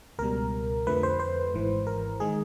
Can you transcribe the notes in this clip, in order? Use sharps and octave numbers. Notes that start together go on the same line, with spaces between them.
C#2 B2 G3 A#4
F2 D3 F3 A3 B4
C5
C5
G#1 G#2 E3
A#4
D#3 G#3 G#4